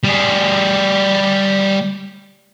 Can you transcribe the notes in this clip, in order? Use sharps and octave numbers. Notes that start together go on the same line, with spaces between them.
G3 G#4